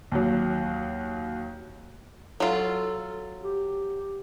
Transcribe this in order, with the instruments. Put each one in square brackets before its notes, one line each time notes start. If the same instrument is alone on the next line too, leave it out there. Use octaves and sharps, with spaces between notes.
[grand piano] D#2 F#3
[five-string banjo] F#3 F4 [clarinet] A4
[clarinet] G4